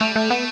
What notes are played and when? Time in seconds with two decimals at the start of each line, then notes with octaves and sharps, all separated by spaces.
0.01 G3 A3
0.16 A3
0.30 A3 B3